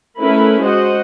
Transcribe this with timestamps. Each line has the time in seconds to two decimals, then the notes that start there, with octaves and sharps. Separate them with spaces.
0.21 A3 C#4 E4 A#4 B4 B5
0.63 G#3 F#4 C5 D#5 F#5